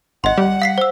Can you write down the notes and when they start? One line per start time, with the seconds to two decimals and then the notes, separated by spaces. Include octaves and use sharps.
0.24 G#1 D#5 F#5 C6
0.38 G3
0.62 F5 B6 C7
0.78 C5 E6